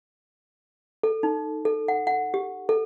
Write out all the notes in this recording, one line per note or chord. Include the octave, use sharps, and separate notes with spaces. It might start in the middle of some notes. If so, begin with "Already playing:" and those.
A4
D#4
A4
F#5
F#5
G4
A4